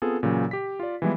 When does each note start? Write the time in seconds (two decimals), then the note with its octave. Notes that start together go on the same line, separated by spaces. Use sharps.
0.02 B3 C4 F4 G#4 A4
0.23 A#2 C#3 E3 F#3
0.51 G4 B6
0.80 F4 D5
1.02 E3 F3 G3 G#3 B3 E4